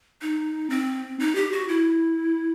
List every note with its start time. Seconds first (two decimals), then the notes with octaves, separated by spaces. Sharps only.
0.22 D#4
0.70 C4
1.19 D#4
1.35 G4
1.52 F#4
1.68 E4